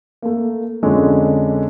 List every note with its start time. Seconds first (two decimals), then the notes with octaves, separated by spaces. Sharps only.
0.22 A3 A#3
0.83 F2 D3 G#3 C#4 D4